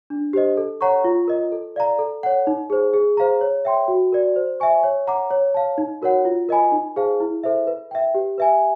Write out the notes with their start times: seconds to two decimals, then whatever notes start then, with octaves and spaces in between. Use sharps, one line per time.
0.10 D4
0.33 G4 C5 D#5
0.57 A4
0.81 C#5 F#5 A#5 C#6
1.04 F4
1.28 A#4 D#5
1.52 A4
1.76 D5 F5 A#5
1.99 A4
2.23 C#5 F#5
2.47 D#4
2.70 G#4 C5
2.94 G#4
3.17 C5 F5 A#5
3.41 C#5
3.65 E5 G5 C6
3.88 F#4
4.12 A#4 D5
4.36 C5
4.60 E5 G#5 C#6
4.84 C#5
5.07 F#5 A#5 D6
5.31 C#5
5.54 F5 A5
5.78 D#4
6.02 F#4 A#4 C#5 F#5
6.25 F4
6.49 A#4 D#5 G#5 B5
6.72 D#4
6.96 G#4 C5 F5 A5
7.20 E4
7.43 A4 C5 E5
7.67 B4
7.91 E5 G5
8.15 G4
8.38 B4 E5 G#5